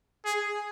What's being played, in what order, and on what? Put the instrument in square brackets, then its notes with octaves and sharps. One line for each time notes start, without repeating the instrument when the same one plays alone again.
[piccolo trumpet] G#4